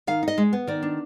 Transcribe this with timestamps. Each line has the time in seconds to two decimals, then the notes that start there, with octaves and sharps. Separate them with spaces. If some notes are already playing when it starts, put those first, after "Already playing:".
0.07 D#3 F5
0.23 D#4 D#5
0.38 G#3
0.53 B3
0.67 D#3 D5
0.83 D4